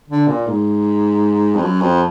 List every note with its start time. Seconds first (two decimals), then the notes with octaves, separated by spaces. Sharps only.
0.08 D3
0.27 A#2
0.47 G#2
1.55 F2
1.62 F#2
1.81 F2